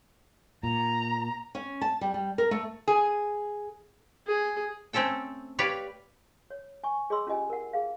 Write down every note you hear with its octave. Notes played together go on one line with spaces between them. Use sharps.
A#2 A#5
C#4
A5
G3
G3
A#4
A3
G#4
G#4
A3 C4 C#4 A4 G5
G4 B4 C#5 D5 F5
C#5
G#5 C#6
G#4 D5 D#5 B5 C6 E6
C#4 F4 G4 D#5 G#5
A#4 F#5
G#4 F5